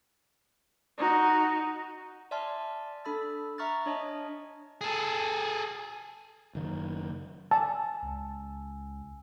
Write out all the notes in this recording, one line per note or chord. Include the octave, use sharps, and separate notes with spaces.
D#4 F#4
D5 E5 G#5 A5 C6 F6
D4 A4 B5 E6 A6
E5 A#5 C#6 F6 F#6 A6
D4 C#5 D#5 G#5 A5
G#4 A4
F#1 D#3
G#5 A5 E6
C#2